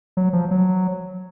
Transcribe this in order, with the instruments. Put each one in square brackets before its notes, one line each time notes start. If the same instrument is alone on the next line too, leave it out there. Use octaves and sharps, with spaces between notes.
[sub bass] F#3
F3
F#3